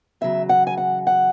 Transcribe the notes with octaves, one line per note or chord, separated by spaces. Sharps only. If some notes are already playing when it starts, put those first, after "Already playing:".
E2 C#3 F#3 E5
F#5
G#5
F#5
F#5